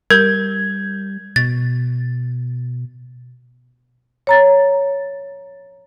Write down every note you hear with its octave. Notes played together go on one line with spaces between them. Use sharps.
G3 A#4 G6 G#6
B2 A6
C#5 A#5 A6